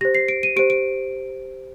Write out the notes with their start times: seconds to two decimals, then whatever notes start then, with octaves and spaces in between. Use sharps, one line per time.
0.01 G4 C5 A#6
0.15 C7
0.28 D7
0.43 D#7
0.56 G4 C5 D7
0.70 D7